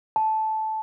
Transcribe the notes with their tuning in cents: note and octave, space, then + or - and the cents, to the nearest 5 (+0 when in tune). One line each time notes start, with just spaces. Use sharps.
A5 -10